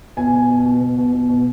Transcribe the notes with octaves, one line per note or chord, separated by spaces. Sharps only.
B2 G#5
B2
B2
B2
B2
B2
B2
B2